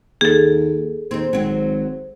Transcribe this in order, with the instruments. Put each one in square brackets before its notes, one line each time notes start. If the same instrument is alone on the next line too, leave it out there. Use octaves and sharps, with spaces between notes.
[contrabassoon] D#2 [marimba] G#4 A4
[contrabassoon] D#2 [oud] C4 D#4
[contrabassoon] G#1 [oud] F#3 C4